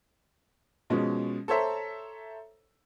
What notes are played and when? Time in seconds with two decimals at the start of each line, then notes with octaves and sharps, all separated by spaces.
0.90 B2 F3 G#3 C#4
1.48 A4 C5 C#5 E5 A#5